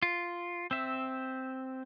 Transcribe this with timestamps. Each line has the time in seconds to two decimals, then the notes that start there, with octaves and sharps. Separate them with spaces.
0.02 F4
0.71 C4 E5